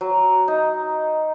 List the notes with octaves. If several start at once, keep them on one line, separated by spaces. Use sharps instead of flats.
F#3
D#4